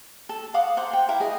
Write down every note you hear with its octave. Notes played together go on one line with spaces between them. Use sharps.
A4
F5 F#5 D6 D#6
C5 F#5 A#5
G5
E4 A#4 B4
G#4 D#5